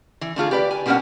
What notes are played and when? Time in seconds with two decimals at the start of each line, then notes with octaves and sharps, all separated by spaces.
0.21 E3
0.36 D3 A3 F4 G#4
0.51 G4 B4 D5
0.71 G#5
0.86 B2 G3 A#3 C#4 D4 F#5